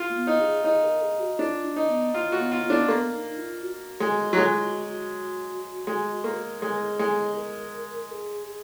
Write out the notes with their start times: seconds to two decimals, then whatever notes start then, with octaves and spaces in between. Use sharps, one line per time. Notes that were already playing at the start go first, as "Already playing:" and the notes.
Already playing: F4
0.09 A#3
0.15 B3
0.27 D#4
0.40 G#4
0.64 D#4 G#4
0.84 A#4
1.02 G#4
1.20 F#4
1.39 D4 F4
1.65 D4
1.76 D#4
1.89 B3
2.14 A#3 F4
2.32 F#4
2.38 B3
2.51 F4
2.63 B3
2.70 D4
2.88 A#3 B3
3.13 D#4
3.38 F4
3.62 F#4
4.00 G#3
4.33 F#3
4.37 G#3 F4
4.63 F#4
4.88 F#4
5.87 G#3
6.24 A#3
6.62 G#3 G#4
6.69 A#4
6.77 G#4
6.99 G#3
7.36 A#4
8.12 G#4
8.48 G#4